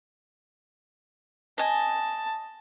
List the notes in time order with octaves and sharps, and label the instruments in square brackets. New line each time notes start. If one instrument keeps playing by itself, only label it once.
[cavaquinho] D#5 G#5 [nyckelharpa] A5